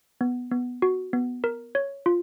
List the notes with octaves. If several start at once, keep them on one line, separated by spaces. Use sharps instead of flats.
B3
B3
F#4
B3
A#4
C#5
F4